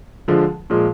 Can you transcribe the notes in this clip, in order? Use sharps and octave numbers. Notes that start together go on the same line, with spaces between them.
D3 F3 G#3
A#2 F3 G#3